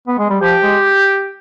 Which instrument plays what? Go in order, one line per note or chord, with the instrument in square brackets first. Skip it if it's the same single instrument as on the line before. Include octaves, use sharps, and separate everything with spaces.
[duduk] B3
G#3
G3
[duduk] F3 [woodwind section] G4
[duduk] G#3